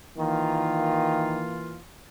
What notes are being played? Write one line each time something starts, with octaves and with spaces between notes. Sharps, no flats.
D#3 E3 A#3 F4